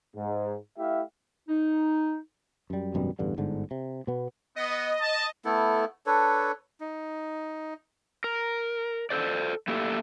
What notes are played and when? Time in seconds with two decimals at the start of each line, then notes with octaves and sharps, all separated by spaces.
0.16 G#2
0.78 A3 E4 G4 E5 F5
1.49 D#4
2.70 F#2 G3
2.94 G#1 F#2 B2 G3
3.19 A1 E2 G2 D3
3.38 G1 G#2 D3
3.71 C3
4.07 B2 B3
4.56 B3 D#5
5.00 A5
5.45 A3 B3 E4 A4
6.06 D4 A4 B4 C#5
6.80 D#4
8.24 A#4
9.10 A4 C5 D5
9.68 A3 A#3 E4 G4 A4